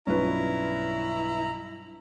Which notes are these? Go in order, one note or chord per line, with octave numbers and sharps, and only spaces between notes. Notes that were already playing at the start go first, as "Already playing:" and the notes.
B1 G2 C#4 E4 F4 B4 A#5